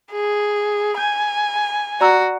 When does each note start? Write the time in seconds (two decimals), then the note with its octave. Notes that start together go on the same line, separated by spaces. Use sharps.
0.11 G#4
0.97 G#5 G6
2.01 F#4 D5 A#5 E6